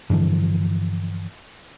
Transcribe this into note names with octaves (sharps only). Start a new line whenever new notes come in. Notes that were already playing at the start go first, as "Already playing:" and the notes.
G2 D3 E3 F3